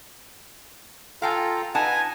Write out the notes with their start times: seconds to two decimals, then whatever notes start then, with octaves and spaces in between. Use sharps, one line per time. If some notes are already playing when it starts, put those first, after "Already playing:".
1.22 F4 A4 F5 G5 G#5 A#5
1.75 D#4 B4 F#5 G#5 A5